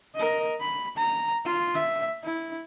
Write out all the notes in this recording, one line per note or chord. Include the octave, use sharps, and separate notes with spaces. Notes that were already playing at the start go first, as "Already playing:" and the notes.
A#4 D#5
B5
A#5
F4
E5
E4